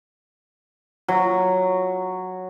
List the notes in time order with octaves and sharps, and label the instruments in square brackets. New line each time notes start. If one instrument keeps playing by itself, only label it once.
[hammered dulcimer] F#3